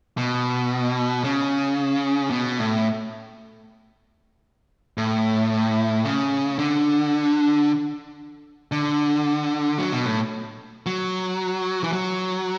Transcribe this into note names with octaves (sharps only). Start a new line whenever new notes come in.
B2
C#3
B2
A2
A2
C#3
D3
D3
F#3
B2
A2
F#3
E3
F#3